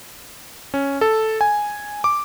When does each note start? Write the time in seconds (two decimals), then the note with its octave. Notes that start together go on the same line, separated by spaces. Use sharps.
0.74 C#4
1.01 A4
1.41 G#5
2.04 D6